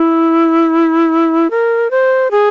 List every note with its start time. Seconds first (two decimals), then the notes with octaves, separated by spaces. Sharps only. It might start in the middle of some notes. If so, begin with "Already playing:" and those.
Already playing: E4
1.50 A#4
1.91 C5
2.31 G#4